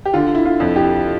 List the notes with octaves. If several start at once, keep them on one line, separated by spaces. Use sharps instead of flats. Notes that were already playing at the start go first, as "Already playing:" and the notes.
G4
D3 F4
E4
F4
F2
E4 G4